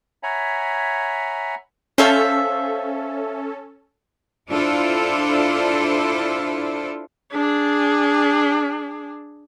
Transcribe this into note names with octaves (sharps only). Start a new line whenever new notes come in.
C#5 E5 F#5 G#5 A#5 B5
C#4 A4 C5 E5 F5
D4 E4 F4 A4 C5
D4 G#4